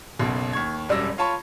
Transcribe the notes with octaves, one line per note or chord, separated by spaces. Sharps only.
F#1 B1 B2
D#2 C#6 G#6
E1 F#2 G3 D5 E6 A#6
F4 C#5 A5 B5 C#6